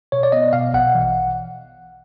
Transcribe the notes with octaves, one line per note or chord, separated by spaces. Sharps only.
B2 C#5
D5
B3 D#5
B2 F5
A#1 F#5
E3